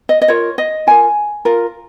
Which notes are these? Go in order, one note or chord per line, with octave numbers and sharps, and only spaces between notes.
D#5
D#5
F4 A#4 C#5
D#5
F4 A#4 G#5
F4 A#4